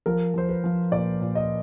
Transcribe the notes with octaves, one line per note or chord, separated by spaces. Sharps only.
F3 A#4
F3 C5
B4
F3
A#2 D5
A#2
D#5